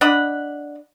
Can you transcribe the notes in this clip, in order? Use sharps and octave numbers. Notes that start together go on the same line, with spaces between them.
D4 D#5 F#5 B5